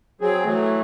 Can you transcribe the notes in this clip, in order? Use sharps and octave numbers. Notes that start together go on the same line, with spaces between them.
F#3 C4 G#4
E3 F#3 A3